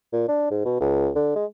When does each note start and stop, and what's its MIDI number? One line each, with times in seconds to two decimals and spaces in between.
0.13 0.25 46
0.29 0.46 62
0.51 0.60 44
0.65 0.78 47
0.80 1.09 37
1.16 1.32 50
1.36 1.45 56